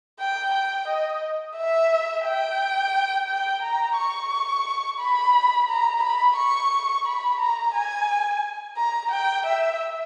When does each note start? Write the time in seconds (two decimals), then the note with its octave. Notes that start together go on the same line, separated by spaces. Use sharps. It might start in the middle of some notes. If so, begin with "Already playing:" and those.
0.19 G5
0.54 G5
0.88 D#5
1.57 E5
2.25 G5
3.28 G5
3.63 A#5
3.97 C#6
5.00 B5
5.69 A#5
6.03 B5
6.37 C#6
7.06 B5
7.40 A#5
7.74 G#5
8.77 A#5
9.11 G5
9.46 E5